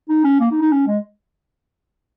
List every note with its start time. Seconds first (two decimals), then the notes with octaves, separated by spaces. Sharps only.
0.09 D#4
0.24 C#4
0.40 A#3
0.51 D#4
0.61 D#4
0.72 C#4
0.87 G#3